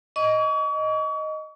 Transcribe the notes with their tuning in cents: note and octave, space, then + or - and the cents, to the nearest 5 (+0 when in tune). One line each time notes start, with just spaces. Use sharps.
D#5 +0 C#6 +40